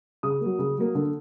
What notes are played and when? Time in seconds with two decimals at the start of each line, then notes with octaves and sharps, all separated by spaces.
0.23 C#3 D#6
0.41 F#3 A#3
0.59 C#3
0.78 F#3 A#3
0.95 D3